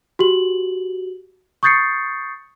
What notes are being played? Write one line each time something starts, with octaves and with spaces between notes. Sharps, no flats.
F#4 G4 F#7
C#6 D#6 G6 A6 C7 C#7